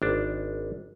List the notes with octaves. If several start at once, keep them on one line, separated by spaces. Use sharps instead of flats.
G#1 D4